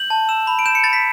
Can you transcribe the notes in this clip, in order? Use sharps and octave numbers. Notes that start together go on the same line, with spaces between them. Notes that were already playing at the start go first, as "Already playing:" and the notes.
Already playing: G6 F#7
A5
E6 E7
B5
D7
G6 E7
C#7
B5 A6
B6